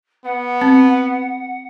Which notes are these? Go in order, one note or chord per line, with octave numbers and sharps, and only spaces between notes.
B3 F#5
C4